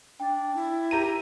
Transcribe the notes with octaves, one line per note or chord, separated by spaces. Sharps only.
D4 G5
E4
G4 A#5 D#7